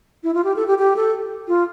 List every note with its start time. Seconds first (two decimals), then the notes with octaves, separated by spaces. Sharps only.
0.24 E4
0.34 F4
0.44 G4
0.56 A4
0.67 G4
0.78 G4
0.96 A4
1.48 F4